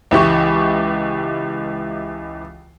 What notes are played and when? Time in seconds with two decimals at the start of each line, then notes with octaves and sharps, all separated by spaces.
0.11 C#2 E3 G4 C#6